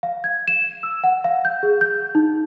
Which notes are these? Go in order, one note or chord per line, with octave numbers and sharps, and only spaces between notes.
F5
G#6
E7
E6
F#5
F5
G6
G#4
G6
D#4